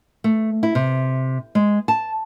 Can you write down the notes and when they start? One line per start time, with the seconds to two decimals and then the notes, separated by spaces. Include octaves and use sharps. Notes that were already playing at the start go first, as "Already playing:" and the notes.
0.24 A3
0.63 E4
0.75 C3
1.55 G#3
1.88 A5